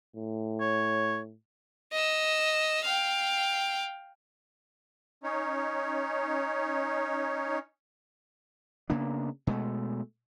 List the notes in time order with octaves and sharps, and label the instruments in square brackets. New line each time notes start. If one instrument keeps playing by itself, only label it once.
[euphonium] A2
[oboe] C#5
[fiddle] D#5 E6
F5 G5
[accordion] C#4 D#4 C#5
[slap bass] C#3 A#3 B3 D4
B2 G#3 A3